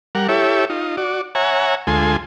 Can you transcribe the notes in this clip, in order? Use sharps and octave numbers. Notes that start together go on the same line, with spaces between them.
G3 A#4 F#5
E4 G4 A4 C#5 E5
D#4 F4
F#4 D5
C#5 E5 F#5 G#5 A#5
D2 G#3 F4 A4 G#5 C6